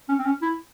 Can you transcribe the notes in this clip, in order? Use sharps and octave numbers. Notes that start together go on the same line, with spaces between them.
C#4
C4
C#4
E4